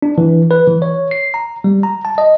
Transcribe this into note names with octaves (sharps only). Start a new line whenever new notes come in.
D4
E3
B4
E3
C#5
C7
A#5
G3
A#5
A5
D#5